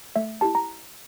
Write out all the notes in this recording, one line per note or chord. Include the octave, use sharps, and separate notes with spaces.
A3 E5
E4 G4 A5
A#5